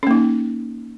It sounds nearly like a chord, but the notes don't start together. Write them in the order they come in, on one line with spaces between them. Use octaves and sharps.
C#4 A#3 D#4